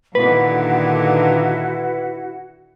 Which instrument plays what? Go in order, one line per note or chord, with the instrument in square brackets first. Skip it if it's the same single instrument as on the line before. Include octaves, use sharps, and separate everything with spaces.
[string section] A#2 D3 D#3 [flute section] E4 F#4 F#5 [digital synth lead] B4